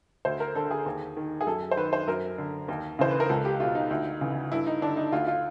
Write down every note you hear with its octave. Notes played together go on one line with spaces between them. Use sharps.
D2 C5
A#4
D3 A4
G#4
D#2
D#3
G#4
F#2 A4
C5
D#3 B4
C5
F#2 A#4
D3
D#2
C#3 E3 C5
B4
A#4
C#2 A4
G4
B2 F4
D#4
D2
C#3 E3
G2 E4
D#4
D3 D4
D#4
D2 F4
F4